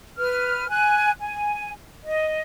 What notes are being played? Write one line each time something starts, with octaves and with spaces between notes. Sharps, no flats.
B4 F6
G#5 F#6
G#5
D#5